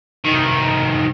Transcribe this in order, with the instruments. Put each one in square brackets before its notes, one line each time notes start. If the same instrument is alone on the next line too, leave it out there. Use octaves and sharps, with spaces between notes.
[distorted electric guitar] C2 D#3